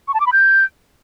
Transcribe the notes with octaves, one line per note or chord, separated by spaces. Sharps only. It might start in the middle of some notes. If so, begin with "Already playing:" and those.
C#6
A5
D6
B5
G6